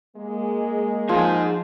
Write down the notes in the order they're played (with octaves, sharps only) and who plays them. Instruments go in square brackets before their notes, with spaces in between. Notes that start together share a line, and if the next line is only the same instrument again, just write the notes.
[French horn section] G#3 A#3
[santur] F3 [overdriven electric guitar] D#4 G#4